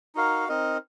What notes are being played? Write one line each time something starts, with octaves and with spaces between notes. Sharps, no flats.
D#4 F#4 A#4 F5
C4 D#4 A#4 D#5